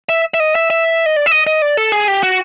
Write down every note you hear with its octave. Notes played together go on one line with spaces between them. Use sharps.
E5
E5
D#5
E5
E5
D#5
D5
E5
D#5
D#5
D5
A4
G#4
G4
F#4